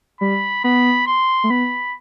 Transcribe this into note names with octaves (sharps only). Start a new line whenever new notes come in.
G3 B5
B3 B5
C6
A3
B3 B5